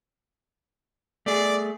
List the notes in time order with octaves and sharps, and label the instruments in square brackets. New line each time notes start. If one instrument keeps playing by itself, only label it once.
[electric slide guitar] A3 G#4 [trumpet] D5